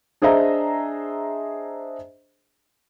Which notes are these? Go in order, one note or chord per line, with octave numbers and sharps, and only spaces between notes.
D4 G#4 C5 D#5 E5 A#5